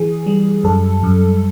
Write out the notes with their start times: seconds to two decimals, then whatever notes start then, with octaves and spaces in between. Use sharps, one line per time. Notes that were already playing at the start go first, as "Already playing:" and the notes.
Already playing: E3 G#4
0.26 G3
0.64 F#2 A4
1.03 F#2